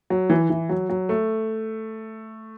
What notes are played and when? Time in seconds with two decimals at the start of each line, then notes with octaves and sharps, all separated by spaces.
0.10 F#3
0.30 E3
0.50 E3
0.69 F#3
0.90 F#3
1.09 A3